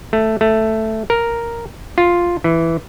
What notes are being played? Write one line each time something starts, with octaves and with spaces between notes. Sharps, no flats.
A3
A3
A#4
F4
E3